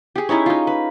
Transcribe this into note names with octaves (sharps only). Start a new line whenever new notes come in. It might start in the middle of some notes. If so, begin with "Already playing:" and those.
G4 G#4
C#4 D#4 E4 C#5
D#4 F4
B4